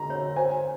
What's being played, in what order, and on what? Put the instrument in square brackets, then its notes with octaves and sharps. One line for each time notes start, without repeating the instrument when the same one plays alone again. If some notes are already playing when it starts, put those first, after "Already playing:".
Already playing: [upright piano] A#5 C6
[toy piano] C#5
[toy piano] C5 [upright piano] G#5